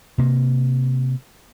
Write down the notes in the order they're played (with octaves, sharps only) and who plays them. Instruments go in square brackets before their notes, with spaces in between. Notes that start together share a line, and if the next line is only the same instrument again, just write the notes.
[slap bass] C3 A#3